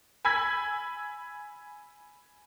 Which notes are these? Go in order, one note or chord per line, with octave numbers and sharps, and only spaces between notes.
G#5 B5 E6 G#6 B6